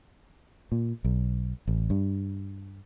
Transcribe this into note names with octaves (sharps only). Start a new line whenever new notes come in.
A#2
B1
A1
G2